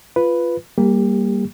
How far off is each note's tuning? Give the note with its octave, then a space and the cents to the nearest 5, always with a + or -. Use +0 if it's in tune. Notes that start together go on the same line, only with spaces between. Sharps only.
F4 -10 B4 +0
G3 +0 A#3 -5 G4 +30